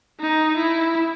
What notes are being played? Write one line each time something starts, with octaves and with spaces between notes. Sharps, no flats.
D#4
E4